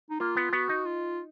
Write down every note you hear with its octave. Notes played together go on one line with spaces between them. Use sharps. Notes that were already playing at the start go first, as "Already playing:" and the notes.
D#4
A#3 F4
B3
B3 F#4
D#4
F4